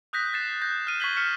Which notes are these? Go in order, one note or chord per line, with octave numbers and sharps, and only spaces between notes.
D#6 F#6 G6 A#6 B6
F#6 A6 C7 E7
G6 A#6
F6 D#7 E7
C#6 F#6 G#6 B6 F#7 G7
F6 C#7 E7